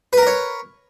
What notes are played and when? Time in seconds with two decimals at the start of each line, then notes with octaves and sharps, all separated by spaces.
0.13 B4
0.17 A#4
0.22 A#5
0.27 C#5